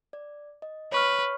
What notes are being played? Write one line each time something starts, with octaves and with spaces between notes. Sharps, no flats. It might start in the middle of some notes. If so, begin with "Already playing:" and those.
D5
D#5
B4 C#5 C#6 F6